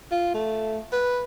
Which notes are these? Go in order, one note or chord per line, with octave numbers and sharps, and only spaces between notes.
F4
A3
B4